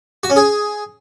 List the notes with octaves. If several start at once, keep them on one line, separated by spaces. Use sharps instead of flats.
F#4
C#4
G#4